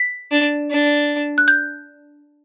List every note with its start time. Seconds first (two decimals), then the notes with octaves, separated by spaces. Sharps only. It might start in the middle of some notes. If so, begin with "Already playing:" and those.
Already playing: B6
0.31 D4
0.71 D4
1.38 F#6
1.48 G6